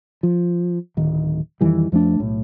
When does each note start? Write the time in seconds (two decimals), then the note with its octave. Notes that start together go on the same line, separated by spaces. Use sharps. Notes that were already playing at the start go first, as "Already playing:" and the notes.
0.23 F3
0.97 D1 D#3
1.61 F2 D#3 E3 G3
1.92 F2 F3 A3 D4
2.20 B1 A2